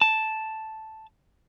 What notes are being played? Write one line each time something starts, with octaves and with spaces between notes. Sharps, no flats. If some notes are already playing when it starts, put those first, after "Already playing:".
A5